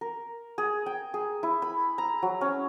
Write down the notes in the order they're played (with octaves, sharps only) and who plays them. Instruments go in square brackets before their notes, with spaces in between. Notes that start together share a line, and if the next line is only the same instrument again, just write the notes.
[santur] A#4
G#4
G5
G#4
E4
B5
A#5
F#3
C#4